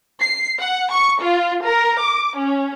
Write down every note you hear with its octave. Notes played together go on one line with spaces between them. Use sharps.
C7
F#5
C#6
F4
A#4
D6
C#4